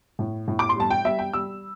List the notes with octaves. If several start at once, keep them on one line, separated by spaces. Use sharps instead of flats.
A2
A2
D6
C6
G3 A5
G5
G3 E5
G5
G3 E6